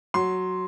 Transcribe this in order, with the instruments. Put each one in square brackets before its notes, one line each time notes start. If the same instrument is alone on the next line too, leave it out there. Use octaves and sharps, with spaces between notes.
[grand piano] F#3 C6